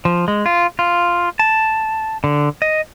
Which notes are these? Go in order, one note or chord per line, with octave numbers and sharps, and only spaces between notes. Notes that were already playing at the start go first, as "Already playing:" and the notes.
F3
G#3
F4
F4
A5
D3
D#5